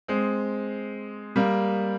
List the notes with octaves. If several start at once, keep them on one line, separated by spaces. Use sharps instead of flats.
G#3 C4
G3 A#3